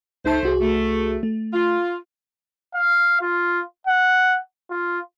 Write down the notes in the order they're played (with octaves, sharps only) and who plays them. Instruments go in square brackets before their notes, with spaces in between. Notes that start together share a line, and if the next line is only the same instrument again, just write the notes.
[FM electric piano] C#2 D#4 A5 [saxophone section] A3 C5
[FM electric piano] C2 F#4 G#4
[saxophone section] A3
[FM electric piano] A3
[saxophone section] F4
[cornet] F5
F4
F#5
F4